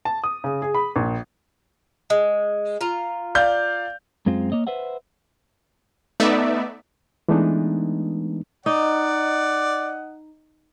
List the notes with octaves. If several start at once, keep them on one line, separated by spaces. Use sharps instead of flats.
A5
D#6
C#3
G#4
B5
A#1
G#3
F4 A#5
D5 F5 G6
F#2 G#3 C4 F4
A#3 C#5 D#5
B4 C5 E5 F#5
A3 B3 D#4 D5 E5
E3 G#3 A3 B3 D4 D#4
D#4 D5 D#5 F#5